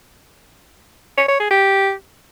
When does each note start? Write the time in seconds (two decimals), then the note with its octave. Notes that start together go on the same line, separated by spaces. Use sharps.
1.17 C#5
1.28 C#5
1.40 G#4
1.51 G4